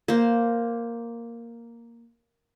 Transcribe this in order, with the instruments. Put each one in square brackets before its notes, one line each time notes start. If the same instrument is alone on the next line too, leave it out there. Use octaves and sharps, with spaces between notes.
[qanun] A#3 C5